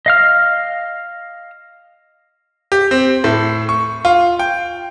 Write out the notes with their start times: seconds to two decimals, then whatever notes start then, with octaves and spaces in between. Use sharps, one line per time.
0.06 D#5 F5 F6
2.72 G4
2.91 C4
3.24 A2
3.69 C#6
4.05 F4
4.39 G5